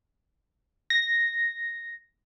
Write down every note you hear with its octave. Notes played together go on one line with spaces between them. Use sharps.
A#6